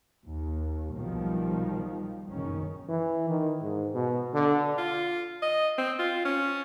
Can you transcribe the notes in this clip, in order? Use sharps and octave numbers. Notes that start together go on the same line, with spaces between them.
D#2
B1 B2 D#3 F3 G3
F#1 B1 D#3 C#4
E3
D#3
G#2
B2
D3
F4
D#5
C4
F4
C#4